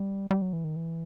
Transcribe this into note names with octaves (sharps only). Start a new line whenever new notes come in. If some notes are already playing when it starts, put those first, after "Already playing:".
Already playing: G3
G3
F#3
E3
D#3
E3